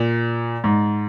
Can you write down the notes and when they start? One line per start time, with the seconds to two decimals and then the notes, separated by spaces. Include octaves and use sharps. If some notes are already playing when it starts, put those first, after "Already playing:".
Already playing: A#2
0.64 G#2